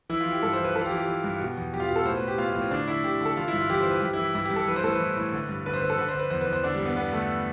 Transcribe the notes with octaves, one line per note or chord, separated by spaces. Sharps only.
E3 E4
F4
E3
G4
G2 A4
C5
E3
B4
E3 A4
F4
G4
E3
G4
E3
G2
B2
E2
E2 G4
F4
G4
B2
A4
A2 C5
B4
A2
G4
A2 F4
F4
A2
C4
D3 D4
D3 E4
D3 G4
D3 A4
E3 F4
E4
G2
F4
E3 G4
C5
E3 B4
G2 G4
E4
E3
G2 E4
G4
G2
A4
E3 B4
C5
A2 A4
B4
E3
A2
D3
G2
D3 B4
C5
D3 B4
A4
D3 B4
C5
D3
B4
E2 C5
B4
E2
C5
D3 D4
G3
G2
B3
D3 B3
D3 A3